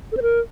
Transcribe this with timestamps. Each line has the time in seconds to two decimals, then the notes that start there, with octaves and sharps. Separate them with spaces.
0.12 A4
0.17 C5
0.22 A#4